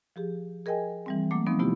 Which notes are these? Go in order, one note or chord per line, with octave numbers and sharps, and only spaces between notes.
F3 G4 G#4
G#4 A#4 D#5 G5 G#5
E3 G3 C4
F#3 A3 A#3 D6
D#3 F3 G3 B3 C4 D#4
C3 A3 B3 E4 F4 G4